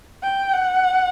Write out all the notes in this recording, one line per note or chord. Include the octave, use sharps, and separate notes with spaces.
G5
F#5